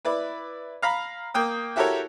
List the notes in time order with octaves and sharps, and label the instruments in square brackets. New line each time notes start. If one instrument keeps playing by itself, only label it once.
[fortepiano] E4 B4 D5
F5 A#5 B5
A#3 G5 D#6
E4 F#4 G4 A4 A#4 C#5